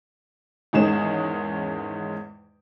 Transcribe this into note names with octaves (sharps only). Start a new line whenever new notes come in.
E2 G#2 D#3 G#3 C#4 E7